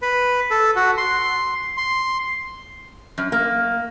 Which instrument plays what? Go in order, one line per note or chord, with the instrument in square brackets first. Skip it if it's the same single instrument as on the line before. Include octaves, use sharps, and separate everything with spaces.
[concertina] B4
A4
F#4
C6
C6
[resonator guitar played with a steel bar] F#2
A#3